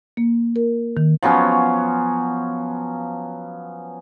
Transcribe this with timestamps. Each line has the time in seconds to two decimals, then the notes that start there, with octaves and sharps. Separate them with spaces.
0.17 A#3
0.56 A#4
0.97 D#3
1.22 F3 F#3 B3 C#4